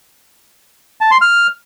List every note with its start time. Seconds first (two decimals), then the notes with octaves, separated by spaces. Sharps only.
1.01 A5
1.11 C6
1.21 F6